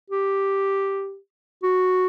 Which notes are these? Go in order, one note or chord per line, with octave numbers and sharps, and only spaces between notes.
G4
F#4